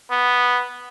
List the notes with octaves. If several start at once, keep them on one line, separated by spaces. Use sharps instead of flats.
B3